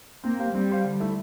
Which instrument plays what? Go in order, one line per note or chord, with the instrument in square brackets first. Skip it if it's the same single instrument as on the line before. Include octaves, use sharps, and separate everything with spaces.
[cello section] A#3 [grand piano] C4
[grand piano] G4 C5 F5
[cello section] G3 [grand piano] C4
[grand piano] G4 C5 F5
D3
A3 E4 A4 E5